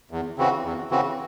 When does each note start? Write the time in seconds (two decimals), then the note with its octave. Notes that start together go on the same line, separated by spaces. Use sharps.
0.11 E2
0.38 C#3 E3 C4 F#4
0.64 E2
0.90 C#3 E3 C4 F#4